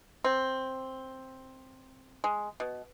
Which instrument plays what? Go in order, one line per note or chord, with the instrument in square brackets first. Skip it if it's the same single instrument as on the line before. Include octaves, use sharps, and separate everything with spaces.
[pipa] C4
G#3
B2